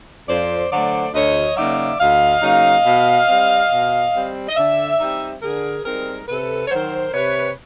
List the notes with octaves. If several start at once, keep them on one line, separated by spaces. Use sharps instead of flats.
F2 C5 D5
D3 F#3 A3 C5 D5
D2 C#5 D#5
C#3 F#3 A#3 D#4 D5 E5
D2 D#5 F5
C#3 F#3 A#3 D#4
B2
G3 C4
B2
G3 C4
D#5
D3 D5 E5
G3 C4 D#4
D3 G#4 A#4
G3 C4 D#4 G#4 A#4
C3 A4 B4
C#5
D#3 F#3 A#4 C5
C3 B4 C#5